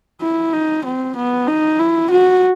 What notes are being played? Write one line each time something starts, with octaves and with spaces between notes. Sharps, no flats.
E4
D#4
C4
B3
D#4
E4
F#4